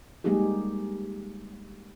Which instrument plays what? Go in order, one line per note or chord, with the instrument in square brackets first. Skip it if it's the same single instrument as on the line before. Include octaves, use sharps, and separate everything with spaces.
[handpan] G3 G#3 A#3 D#4 G4 G#4